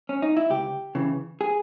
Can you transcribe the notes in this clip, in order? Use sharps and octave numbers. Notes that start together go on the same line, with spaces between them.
C#4
D#4
E4
C#2 G4
C#3 E3
G#4